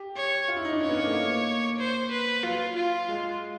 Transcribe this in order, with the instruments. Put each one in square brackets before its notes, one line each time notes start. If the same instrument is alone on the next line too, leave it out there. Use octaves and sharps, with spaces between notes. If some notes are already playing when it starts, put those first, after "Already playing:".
Already playing: [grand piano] G4
[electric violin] C#5
[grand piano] F4
E4
D#4
D4
[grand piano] C#4 [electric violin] C#5
[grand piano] B3
A#3
A3
A#3
[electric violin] C5
B4
[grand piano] F#3 [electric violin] F4
[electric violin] F4
[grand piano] G#3